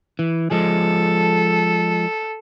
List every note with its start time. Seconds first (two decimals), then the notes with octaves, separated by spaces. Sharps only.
0.19 E3
0.51 F3 G#3 A4